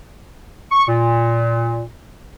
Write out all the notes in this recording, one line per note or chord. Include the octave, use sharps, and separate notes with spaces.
C#6
A#2